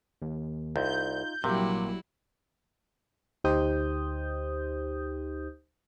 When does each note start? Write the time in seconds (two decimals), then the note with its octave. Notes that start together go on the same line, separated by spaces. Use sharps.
0.22 D#2
0.76 C2 D#4 F4 G6
1.44 A#1 C3 F#3 G3 A#3 E4 G4
3.44 D2 D#4 G4 C5 D#6 G6